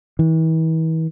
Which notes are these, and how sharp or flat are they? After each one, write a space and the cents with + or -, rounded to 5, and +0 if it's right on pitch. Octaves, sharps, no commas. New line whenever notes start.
E3 -40